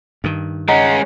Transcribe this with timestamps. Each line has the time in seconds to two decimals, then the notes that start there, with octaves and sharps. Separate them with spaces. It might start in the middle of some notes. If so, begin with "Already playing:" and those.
0.24 G2 D#3
0.68 G#3 C#4 D#5 F#5 A#5